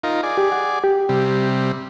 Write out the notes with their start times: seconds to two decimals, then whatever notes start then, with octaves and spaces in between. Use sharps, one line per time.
0.04 D#4 F4 A#4
0.23 G#4 D5
0.38 G4
0.52 F#5
0.84 G4
1.09 C3 G3